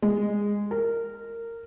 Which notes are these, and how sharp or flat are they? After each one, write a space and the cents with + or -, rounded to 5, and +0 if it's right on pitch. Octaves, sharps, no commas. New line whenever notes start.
G#3 -15
A#4 -15